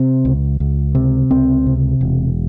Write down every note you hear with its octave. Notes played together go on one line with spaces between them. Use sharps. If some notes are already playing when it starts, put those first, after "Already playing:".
Already playing: C3 C4
C#2
C#2
C3
C#2 C4
C3
E1